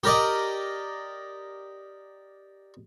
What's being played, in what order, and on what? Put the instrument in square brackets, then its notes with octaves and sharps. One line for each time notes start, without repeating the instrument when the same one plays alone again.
[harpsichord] G4 A#4 D5 D#5